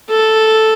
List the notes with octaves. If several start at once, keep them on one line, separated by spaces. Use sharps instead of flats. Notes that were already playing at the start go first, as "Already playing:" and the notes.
A4